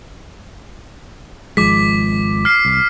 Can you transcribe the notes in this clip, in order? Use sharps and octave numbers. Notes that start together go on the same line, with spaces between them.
G#1 F3 G#3 D6 B6
F6 C7
C2